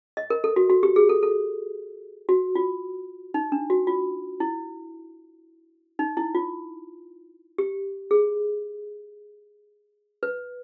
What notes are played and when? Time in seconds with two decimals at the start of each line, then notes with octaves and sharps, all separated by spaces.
0.17 D#5
0.30 A#4
0.44 A4
0.56 F#4
0.70 F#4
0.83 G4
0.96 G#4
1.09 A4
1.23 A4
2.29 F#4
2.55 F4
3.34 D#4
3.52 D4
3.70 F#4
3.87 F4
4.40 E4
5.99 D#4
6.17 E4
6.35 F4
7.58 G4
8.11 G#4
10.23 B4